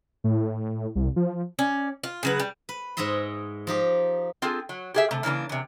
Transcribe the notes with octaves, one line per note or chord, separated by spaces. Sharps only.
A2
C2
F3
C#4 D5
F4
C#3 F#3 B4
G3
B4
G#2 G#3 D#5 E5 C6
F3 D#4 G4
C4 F4 G#4 A4
F#3
G4 G#4 E5
C3 A3
C#3 E3 A#3 D4
E2 C3